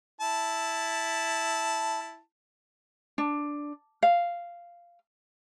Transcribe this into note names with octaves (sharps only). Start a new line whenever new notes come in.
E4 A5
D4
F5